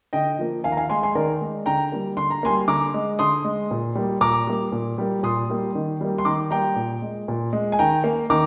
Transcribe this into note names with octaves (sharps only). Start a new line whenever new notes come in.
D3 D#5 G5
F3 A#3
D#3 F5 G#5
A#5
F5 G#5
G#3 G#5 C6
G#5 C6
D#3 A#4 D5
G#3
D3 G5 A#5
G3 A#3
D3 C6
A#5
G3 A#3 G#5 C6
D3 A#5 D6
G#3
D3 C6 D#6
G#3
A#2
G3 A#3
A#2 A#5 D6
G3 A#3
A#2
G3 A#3
A#2 C6 D#6
G3 A#3
D#3
G3 A#3
C6
D#3 A#5 D6
G3 A#3 G5 A#5
A#2
G#3
A#2
G#3
G#5
D#3 G5 A#5
A#3
D#3 A#5 D6